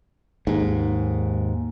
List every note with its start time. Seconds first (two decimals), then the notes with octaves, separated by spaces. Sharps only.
0.47 D#2 G#2